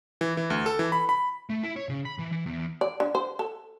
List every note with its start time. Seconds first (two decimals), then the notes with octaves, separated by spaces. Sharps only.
0.21 E3
0.37 E3
0.50 D2
0.66 A4
0.79 E3
0.92 B5
1.09 B5
1.50 A3
1.63 E4
1.76 C#5
1.89 C#3
2.05 B5
2.19 E3
2.32 E3
2.46 E2
2.81 D5
3.00 D3
3.15 C5
3.39 A4